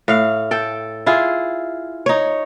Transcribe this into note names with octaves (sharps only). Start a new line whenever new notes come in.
A2 F5
A4 G5
E4 F4 G#4
D#4 C#5